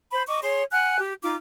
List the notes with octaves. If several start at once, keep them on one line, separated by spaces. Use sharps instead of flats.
C5 B5
D#5 C#6 D6
G#4 C#5 C6
F#5 G#5 F6 F#6
G4
D#4 F4 D6